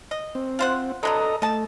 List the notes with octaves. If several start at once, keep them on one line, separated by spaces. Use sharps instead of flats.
D#5
C4
F4 C5 F#5
D3 F#3 B3 A4 D#5 A#5
A3 D#5 A5